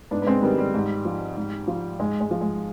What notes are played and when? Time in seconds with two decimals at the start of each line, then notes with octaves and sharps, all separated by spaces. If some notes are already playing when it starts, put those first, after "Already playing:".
0.11 G#2 B3 D4
0.22 B3
0.27 G#3 C4
0.42 D#3 G3 B3
0.58 G3
0.74 G#2
1.05 F3
1.37 G#2
1.67 F3
2.00 G#2 G#3
2.21 G#3
2.31 F3
2.41 G#3